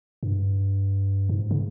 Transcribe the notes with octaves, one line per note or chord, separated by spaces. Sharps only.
G2
G#2
C#3